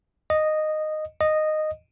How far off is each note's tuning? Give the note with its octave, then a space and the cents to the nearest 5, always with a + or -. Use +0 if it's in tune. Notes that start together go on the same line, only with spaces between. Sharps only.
D#5 -10
D#5 -10